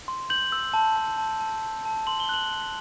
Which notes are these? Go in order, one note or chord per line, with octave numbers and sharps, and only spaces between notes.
C6
G6 F#7
E6
A5
A5
A5
A5
A5
A5
C6 F#7
G7
F#6 F#7
C6